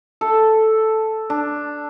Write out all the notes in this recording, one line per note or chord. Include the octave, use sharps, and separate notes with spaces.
A4
D4